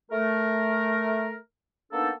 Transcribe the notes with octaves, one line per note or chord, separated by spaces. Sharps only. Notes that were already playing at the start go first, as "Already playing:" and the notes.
A3 A#4
A#3 B3 D4 D#4 A4